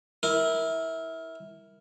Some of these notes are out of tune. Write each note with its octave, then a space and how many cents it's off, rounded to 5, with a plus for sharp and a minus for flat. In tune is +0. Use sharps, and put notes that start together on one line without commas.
E4 -20 A#4 +0